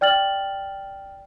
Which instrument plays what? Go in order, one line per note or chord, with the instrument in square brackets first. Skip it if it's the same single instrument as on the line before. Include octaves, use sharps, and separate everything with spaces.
[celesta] D5 G5 F6 A6 F#7